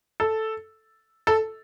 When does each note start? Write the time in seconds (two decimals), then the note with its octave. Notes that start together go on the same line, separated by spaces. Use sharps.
0.20 A4
1.27 A4